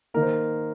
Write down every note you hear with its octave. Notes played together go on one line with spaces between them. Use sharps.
D#3 A#3 A#4
C5